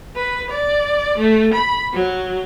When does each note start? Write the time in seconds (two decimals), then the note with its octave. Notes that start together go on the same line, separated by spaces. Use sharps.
0.16 B4
0.50 D5
1.18 A3
1.53 B5
1.93 F#3